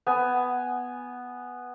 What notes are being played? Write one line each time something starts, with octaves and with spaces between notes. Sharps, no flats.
B3 G#5